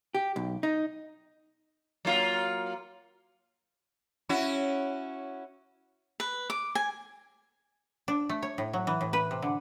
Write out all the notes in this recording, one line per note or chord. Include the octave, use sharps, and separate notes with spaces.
G4
B1
D#4
F#3 A#3 F4
C#4 E4 F#4
B4
D6
G#5
D4
A3
C#5
A2
F#3
E3
A2
B4
C3
D3